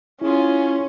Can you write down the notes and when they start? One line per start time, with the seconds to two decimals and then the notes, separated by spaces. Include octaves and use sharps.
0.21 C#4 E4 F4 G#4